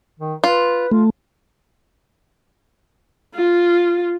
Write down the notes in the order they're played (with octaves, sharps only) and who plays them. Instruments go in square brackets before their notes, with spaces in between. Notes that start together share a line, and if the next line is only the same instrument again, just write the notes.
[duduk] D#3
[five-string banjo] F4 [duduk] B4
[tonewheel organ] A3 [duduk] F4
[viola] F4